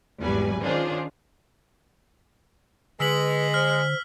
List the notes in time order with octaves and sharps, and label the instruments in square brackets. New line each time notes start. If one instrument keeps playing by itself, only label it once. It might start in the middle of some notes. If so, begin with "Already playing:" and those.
[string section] G#1 E2 F#3 G3 B4 G#5
D#3 C#4 D4 F4 G#4 C5
[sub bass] D3 [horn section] G#3 [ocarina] B4 [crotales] E6 B6 F#7
[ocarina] C5 [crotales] F6